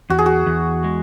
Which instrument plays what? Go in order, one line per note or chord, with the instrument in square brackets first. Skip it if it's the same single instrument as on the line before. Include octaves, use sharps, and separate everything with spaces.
[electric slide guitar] E2 [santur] F#4
[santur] G#4
F#4
[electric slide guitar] E2
G#3